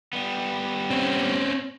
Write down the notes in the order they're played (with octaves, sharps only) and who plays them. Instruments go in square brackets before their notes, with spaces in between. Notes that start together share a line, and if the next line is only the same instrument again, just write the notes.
[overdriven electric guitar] G3 B3
[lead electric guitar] C4 C#4